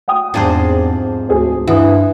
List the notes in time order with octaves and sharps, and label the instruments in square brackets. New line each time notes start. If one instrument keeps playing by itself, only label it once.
[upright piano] F#5 G5 D#6
[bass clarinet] E2 [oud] G#2 C3 F3 [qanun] D4 G#4 C5
[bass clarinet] D2 [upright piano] C4 G#4
[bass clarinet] G2 [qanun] E3 [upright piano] F#5 D#6